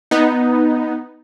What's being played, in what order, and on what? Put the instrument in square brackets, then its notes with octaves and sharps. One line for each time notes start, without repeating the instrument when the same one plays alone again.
[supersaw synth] B3 D#4